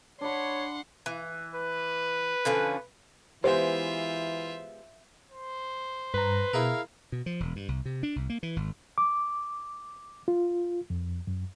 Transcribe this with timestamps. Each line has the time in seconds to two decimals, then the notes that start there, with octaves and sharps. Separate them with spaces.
0.21 D4 C#5 F#5 B5 C6
1.06 E3
1.55 B4
2.45 D3 F3 C#4
3.44 E3 G#3 B3 F4 G4 C5 E5
5.31 C5
6.14 G2 B4 A#5
6.53 B2 E4 G#4 A#4 F5
7.12 B2
7.26 F3
7.40 E1
7.56 G2
7.68 C2
7.85 C3
8.03 D4
8.16 C2
8.30 A#3
8.43 E3
8.56 G#1
8.98 D6
10.28 F4
10.90 F2
11.27 F#2